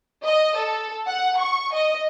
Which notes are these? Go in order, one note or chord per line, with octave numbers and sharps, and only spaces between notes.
D#5
A4
F#5
C#6
D#5